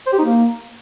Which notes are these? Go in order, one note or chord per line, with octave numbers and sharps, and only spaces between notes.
C5
G4
D#4
A#3